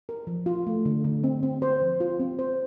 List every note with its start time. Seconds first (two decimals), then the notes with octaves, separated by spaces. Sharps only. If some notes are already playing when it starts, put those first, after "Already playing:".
0.09 A#4
0.27 F3
0.46 F4
0.67 A3
0.85 D3
1.04 D3
1.24 C4
1.43 C4
1.62 C5
1.82 F3
2.00 F4
2.20 C4
2.39 C5